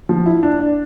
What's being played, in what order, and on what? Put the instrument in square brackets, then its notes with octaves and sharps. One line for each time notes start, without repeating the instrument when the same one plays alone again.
[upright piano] F3
E4
D4
D5